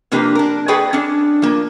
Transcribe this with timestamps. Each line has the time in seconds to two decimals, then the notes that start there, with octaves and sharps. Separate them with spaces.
0.12 C3 F3 A#3 D4 G4 B4
0.35 D4 A#4
0.68 F#4 G#4 A4 B4 D5 G5
0.93 C#4 D4
1.42 F3 A#3